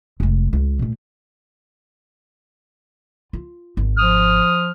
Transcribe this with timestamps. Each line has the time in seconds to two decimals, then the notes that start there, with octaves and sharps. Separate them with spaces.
0.20 F1 G#3
0.53 C#2
0.79 A#2 A3
3.33 F4
3.77 G#1
3.97 F3 D#6 F6